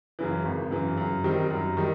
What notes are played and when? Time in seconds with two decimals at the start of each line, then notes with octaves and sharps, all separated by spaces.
0.19 F#2 C#3 E3
0.45 G#1
0.71 F#2 C#3 E3
0.98 F#2
1.24 D#3 G3 C4
1.51 F#2
1.77 D#3 G3